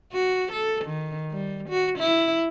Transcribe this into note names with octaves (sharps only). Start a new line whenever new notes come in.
F#4
A4
D#3
G3
F#4
E4